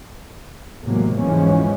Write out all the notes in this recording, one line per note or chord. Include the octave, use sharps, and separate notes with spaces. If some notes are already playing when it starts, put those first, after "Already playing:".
E2 A2 C3 F#3 G#3 A#3
G#2 E3 F3 G#3 C#4